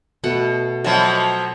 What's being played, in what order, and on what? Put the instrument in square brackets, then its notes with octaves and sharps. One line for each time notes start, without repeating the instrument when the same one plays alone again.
[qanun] B2 A3 F#5
[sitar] B2 F3 F#3 [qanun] E5